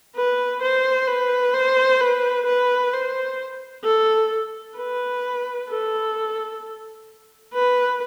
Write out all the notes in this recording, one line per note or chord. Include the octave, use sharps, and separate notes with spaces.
B4
C5
B4
C5
B4
B4
C5
A4
B4
A4
B4